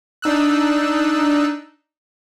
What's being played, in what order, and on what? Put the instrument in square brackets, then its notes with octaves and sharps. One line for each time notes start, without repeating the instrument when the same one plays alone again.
[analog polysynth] D4 D#4 E6 F#6